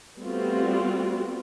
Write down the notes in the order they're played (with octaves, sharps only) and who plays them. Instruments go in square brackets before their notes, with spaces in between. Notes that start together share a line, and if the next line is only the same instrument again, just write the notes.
[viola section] G3 A3 B3 C4 F4 F#4